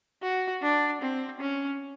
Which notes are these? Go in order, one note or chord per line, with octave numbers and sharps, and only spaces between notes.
F#4
D4
C4
C#4